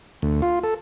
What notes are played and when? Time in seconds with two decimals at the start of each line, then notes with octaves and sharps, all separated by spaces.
0.22 D2
0.42 F4
0.64 A4